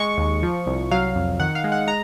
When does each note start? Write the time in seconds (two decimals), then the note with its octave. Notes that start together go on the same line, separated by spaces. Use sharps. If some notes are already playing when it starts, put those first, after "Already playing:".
Already playing: G#3 C#6
0.18 D#2
0.43 F3
0.66 C2
0.91 F#3 F5
1.15 F2
1.40 D#3 F#5
1.55 F5
1.64 G#3
1.72 F#5
1.87 G#3 A#5